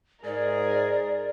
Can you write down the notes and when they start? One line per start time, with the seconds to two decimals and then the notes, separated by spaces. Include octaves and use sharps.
0.25 G#2 G#4 A#4 D5